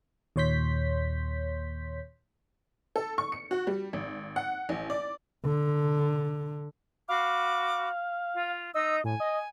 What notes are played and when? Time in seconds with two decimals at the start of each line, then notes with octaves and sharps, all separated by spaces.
0.36 D#2 A#2 C#5 C6 G6 B6
2.96 A4
3.18 C#6
3.32 C#7
3.51 F#4
3.67 G3
3.93 G#1
4.36 F#5
4.69 A1
4.90 D5
5.45 D3
7.08 F#4 F5 B5 D6
8.34 F4
8.74 D#4 D#5 E6
9.04 A2 G#5
9.20 D#5